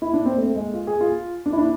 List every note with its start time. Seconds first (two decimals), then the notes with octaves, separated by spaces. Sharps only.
0.02 E4
0.13 D4
0.26 C4
0.38 A3
0.56 G#3
0.73 F4
0.87 G#4
1.01 F4
1.46 D4
1.53 E4
1.58 D4